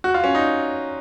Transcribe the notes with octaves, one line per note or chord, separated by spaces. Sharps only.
F#4
F4
C#4
D#4